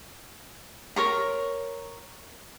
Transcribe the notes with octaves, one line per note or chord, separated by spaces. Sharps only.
A#4 C#5 A#5